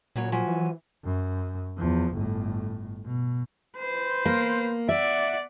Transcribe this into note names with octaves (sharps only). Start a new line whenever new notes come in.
A#2 C#3 F#3 C#5
F3 F#3 G#5
E3
F#2
E2 F3
G1 A2
B2
B4 C5
A#3
D5 E5 F#5